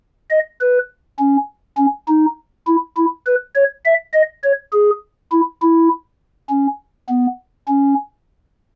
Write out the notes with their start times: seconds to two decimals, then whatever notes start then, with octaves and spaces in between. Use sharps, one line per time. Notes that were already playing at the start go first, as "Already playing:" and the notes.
0.31 D#5
0.60 B4
1.19 C#4
1.77 C#4
2.08 D#4
2.67 E4
2.96 E4
3.26 B4
3.55 C#5
3.85 E5
4.13 D#5
4.43 C#5
4.73 G#4
5.32 E4
5.62 E4
6.49 C#4
7.09 B3
7.68 C#4